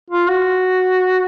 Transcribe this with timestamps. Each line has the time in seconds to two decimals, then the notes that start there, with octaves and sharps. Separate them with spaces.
0.10 F4
0.29 F#4